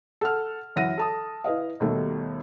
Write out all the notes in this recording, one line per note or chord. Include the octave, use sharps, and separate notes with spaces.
A4 F#5 F6
F#2 E3 E5 F#5 A#6 D#7
A4 A5 D#6
E4 B4 D#5 F5
D#2 B2 D#3 G3 A3